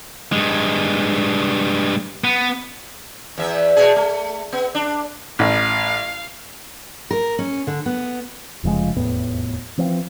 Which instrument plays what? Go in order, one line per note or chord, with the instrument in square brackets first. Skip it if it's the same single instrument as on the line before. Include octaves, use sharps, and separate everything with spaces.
[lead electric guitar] G2 G#3
B3
[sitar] E2 E5
B2 G#4
A3
B3
D4
[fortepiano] A1 [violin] F5
[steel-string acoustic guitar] A#4
C#4
D3
B3
[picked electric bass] F1 C#3 F3 G#3
F1 E2 A2 B3
E3 F3 C4